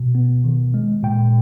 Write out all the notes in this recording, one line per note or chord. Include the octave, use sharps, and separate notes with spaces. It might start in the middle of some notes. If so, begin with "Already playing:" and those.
Already playing: B2
B3
D#3
G#3
A#2 G5